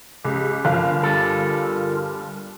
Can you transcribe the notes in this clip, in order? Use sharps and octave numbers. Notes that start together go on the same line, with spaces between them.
C#2 G4
G1 F4 A#4 F5
G3 A4